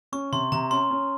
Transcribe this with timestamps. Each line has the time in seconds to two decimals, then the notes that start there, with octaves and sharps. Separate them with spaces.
0.12 C#4 C#6
0.32 C3 C6
0.52 C3 A#5
0.71 C#4 C6
0.91 C#4